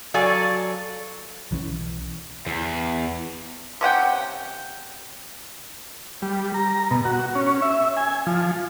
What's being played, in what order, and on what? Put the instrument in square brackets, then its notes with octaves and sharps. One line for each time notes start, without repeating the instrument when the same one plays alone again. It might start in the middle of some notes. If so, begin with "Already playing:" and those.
[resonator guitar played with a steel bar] F#3 A4 D5 F5 G#5
[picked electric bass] B1 E3 F#3 C#4
[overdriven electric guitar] E2
[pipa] C3 C#4 F#5 G5
[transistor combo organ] G3
A#5
B2
F#4
C#4
E5
G#5
F3